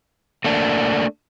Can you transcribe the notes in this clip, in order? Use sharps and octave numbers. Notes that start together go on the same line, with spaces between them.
A3 A#3 D4